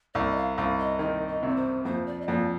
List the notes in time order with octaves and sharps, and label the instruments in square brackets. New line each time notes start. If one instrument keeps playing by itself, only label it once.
[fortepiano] C2 [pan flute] D5
[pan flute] D#5
F5
[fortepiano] C2 [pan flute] F5
[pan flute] D#5
[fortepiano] D#3 [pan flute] D#5
[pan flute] D#5
[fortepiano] C3
[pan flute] D5
C5
[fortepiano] F2 [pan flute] C5
[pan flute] D5
D#5
[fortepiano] F2 [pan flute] D5